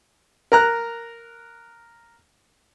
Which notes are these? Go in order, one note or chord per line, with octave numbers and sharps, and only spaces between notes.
A#4 A#5 F#6